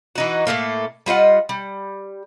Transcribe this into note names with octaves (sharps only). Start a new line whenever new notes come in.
E3 D#4 F#4
A2 D3 A3 A#3
G3 F4 D#5 F#5
G3